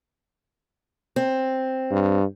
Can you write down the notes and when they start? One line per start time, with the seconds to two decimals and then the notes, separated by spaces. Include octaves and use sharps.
1.16 C4
1.91 G2